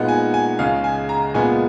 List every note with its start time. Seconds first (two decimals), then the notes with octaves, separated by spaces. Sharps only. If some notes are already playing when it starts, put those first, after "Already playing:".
Already playing: A#2 G#3 B3 D#4 F#5
0.08 G#5
0.34 G#5
0.59 C#2 C#3 G#3 F5
0.84 G#5
1.09 A#5
1.34 A#2 G#3 B3 G#5